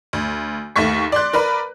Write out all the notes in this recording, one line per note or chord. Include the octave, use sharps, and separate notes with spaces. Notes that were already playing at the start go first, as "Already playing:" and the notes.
D2
D#2 A3 C#6 B6
D5 C6 F#6
A#4 B4 D5